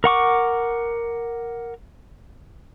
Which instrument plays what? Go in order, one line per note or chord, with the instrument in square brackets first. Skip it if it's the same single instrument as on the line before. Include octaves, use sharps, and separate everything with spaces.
[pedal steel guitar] A#4 F#5 C#6 D6